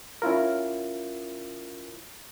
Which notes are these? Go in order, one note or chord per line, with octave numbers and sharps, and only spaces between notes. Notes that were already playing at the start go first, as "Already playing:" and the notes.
C#4 E4 F4 A#4